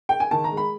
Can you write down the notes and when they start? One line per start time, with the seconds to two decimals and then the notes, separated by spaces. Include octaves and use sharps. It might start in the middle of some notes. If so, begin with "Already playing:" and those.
0.09 G5
0.20 G#5
0.31 D#3 A5
0.44 A#5
0.52 G#3
0.57 B5